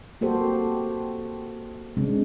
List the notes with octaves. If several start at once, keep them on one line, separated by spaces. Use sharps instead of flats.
A#3 F#4 G4 A4 C5
C#3 G#3 C4 D4